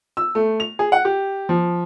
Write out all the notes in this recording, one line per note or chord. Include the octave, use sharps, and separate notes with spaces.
E6
A3
F7
G#4
F#5
G4
F3